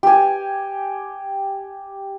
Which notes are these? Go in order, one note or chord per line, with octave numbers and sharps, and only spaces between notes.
G4 G#5